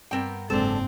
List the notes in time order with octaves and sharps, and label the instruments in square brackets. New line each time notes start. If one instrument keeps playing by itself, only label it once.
[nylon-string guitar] G2 A#4 [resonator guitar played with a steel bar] B3 C4 G5
[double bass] F#1 G#2 [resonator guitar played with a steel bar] D3 A4 [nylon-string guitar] G#3 C5 [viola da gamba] C4